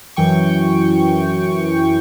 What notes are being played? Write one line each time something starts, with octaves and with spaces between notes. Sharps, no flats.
F#2 E3 G5 C#6